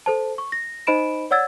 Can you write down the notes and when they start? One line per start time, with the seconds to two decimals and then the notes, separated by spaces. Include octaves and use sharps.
0.06 A4 C5 A5
0.38 C#6
0.52 A#6
0.87 D#4 C5 D#5 B5 D7 E7
1.31 C#5 D5 F#5 E6 G#6 A6